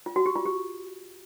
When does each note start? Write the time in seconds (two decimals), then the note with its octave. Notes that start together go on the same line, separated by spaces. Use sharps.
0.06 F4
0.16 F#4
0.26 G4
0.36 F4
0.45 G4